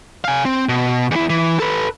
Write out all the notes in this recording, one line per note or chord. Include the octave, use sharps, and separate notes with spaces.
F5 G#5
C4
B2
E2 E4
E3
A4 B4